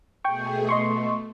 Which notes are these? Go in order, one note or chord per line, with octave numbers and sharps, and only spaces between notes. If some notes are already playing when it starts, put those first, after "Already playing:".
B2 A3 G#4 G5 C#6
B2 A3 D#5 C6 C#6